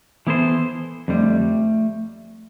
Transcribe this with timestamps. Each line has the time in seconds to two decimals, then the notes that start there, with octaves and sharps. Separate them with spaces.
0.27 E3 B3 E4 A4 C5
1.08 F2 D3 G3 A3